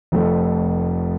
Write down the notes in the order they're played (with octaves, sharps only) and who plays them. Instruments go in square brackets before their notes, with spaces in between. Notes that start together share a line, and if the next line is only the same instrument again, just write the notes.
[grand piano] F1 F2 A3 A4